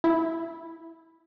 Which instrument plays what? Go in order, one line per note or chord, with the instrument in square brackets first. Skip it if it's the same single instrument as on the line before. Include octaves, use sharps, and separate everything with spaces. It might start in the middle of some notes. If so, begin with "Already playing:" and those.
[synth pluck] E4